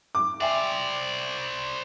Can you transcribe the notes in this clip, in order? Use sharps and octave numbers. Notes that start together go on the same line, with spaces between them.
D6
C5 D5 E5 G5 G#5